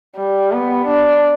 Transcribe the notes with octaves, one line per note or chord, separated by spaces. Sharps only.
G3
B3
D4